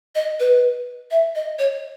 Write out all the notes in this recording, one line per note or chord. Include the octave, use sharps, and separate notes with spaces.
D#5
B4
E5
D#5
C#5